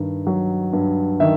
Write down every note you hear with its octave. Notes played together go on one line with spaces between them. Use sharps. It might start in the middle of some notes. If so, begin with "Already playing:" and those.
Already playing: G2 D#3
F#3
G2
D#3 E5